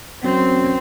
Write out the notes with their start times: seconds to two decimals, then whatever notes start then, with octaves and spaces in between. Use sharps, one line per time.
0.24 F#2 C4